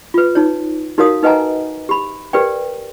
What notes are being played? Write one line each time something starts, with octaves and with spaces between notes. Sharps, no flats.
F4 B4
D#4 C#5
D#4 F#4 A#4 C#5 F5 D#6
D#4 B4 D#5 F#5 G#5 A#5
G4 B5
G4 A#4 B4 D5 G5